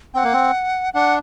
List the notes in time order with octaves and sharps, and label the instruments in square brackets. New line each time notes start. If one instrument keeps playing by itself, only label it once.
[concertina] C4 [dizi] F#5 G5
[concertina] A#3
C4
[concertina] D4 [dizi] F#5